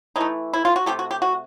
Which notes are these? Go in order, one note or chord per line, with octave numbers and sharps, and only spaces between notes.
E3 A3 D#4
E4
F4
F#4
C3 F3 A3 G4
F#4
G4
F#4